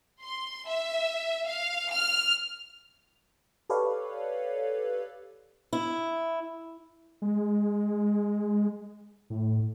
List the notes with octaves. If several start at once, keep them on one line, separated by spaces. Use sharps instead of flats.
C6
E5
F5
F6
G4 A4 B4 C#5 D5 F5
E4
G#3
A2